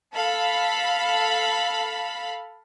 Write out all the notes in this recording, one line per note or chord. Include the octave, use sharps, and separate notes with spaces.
A4 F5 B5